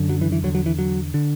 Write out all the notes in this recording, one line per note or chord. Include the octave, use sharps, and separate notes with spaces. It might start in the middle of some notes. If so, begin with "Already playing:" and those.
Already playing: F#2 D3
F#3
E3
E3
E2 D3 F#3
F#3
E3
F#3
D3